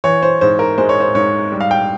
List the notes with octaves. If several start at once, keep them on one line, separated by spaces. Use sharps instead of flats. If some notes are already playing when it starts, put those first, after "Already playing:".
E3 C#5
C5
G#2 C5
A#4
G#3 C5
C#5
C5
G#2 C#5
G3
F5
G5